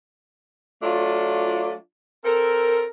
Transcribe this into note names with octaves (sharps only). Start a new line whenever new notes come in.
F#3 A3 D4 F4
C4 A4 A#4